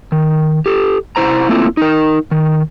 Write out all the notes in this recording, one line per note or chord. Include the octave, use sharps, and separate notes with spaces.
D#3
G4 A4
C3 E4 C5 A#5
A3 A#3 C4 E4 F4
D#4 A#4
D#3